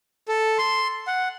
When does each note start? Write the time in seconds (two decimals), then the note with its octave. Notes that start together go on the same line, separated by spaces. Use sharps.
0.28 A4
0.58 C6
1.07 F#5